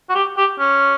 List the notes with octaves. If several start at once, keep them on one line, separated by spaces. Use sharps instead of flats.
F#4
G4
G4
C#4